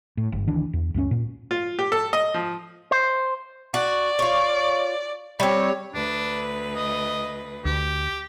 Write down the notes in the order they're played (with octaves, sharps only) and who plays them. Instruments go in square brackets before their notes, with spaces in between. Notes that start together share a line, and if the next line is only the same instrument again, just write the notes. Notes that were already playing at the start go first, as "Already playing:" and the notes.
[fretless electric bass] A2
G1
D2 D#3 E3 D4
E2
C#2 F#2 F3 C#4
A#2
[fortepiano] F4
G4
A4
D#5
F3
[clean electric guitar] C5
[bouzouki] F#4 [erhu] D5
[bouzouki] F4 C#5
[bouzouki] G3 C4 [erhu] C#5
[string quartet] D2 B4 [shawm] D4
[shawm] D#5
[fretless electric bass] D2 [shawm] G4